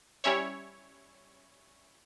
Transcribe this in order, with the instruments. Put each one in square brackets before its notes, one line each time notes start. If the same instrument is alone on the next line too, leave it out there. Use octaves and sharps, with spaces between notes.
[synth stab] G3 C#4 E4 C#5